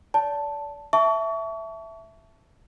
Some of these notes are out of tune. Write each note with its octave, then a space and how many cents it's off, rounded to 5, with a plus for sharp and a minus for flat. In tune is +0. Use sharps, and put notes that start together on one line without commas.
D5 -30 A5 +0
E5 +0 A5 -5 C#6 +35